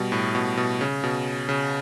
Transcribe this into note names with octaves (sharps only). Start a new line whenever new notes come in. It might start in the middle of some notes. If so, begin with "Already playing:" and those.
Already playing: B2 G3
A2
B2
B2
C#3
B2
C#3